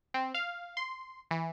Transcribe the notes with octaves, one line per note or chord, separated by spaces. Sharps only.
C4
F5
C6
E3